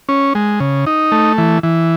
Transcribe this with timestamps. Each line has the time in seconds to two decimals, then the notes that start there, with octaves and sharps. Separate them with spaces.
0.09 C#4
0.35 G#3
0.60 C#3
0.87 D#4
1.12 A3
1.38 E3
1.63 E3